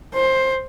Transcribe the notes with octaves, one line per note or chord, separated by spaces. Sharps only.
C5